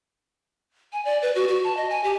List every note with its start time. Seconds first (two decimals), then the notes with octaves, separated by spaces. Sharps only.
0.93 G#5
1.05 D5
1.22 B4
1.35 F#4
1.48 F#4
1.64 A5
1.77 D#5
1.90 G#5
2.04 G4